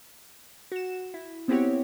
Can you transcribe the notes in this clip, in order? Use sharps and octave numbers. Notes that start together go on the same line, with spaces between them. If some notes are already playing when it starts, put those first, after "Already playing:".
F#4 E7
E4
B3 C4 E4 F#4 G4 C#5